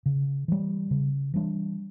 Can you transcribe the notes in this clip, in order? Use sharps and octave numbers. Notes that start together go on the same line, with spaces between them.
C#3
E3 G3
C#3
E3 G3 D4